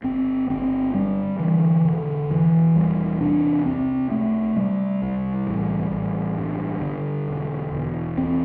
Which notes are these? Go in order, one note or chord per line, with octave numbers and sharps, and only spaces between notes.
G1 C4
G1 C4
G2 G3
D3 E3
E1 D3
E1 E3
E2 G3
C3 D4
C2 C4
C3 A3
C3 G3
C2
A1
A1
G2
D3
E1
E1
E2 C4